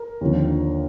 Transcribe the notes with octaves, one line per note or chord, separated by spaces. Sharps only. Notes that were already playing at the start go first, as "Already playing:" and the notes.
Already playing: A#4
D#2 D3 F3